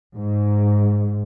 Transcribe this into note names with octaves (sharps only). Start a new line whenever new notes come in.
G#2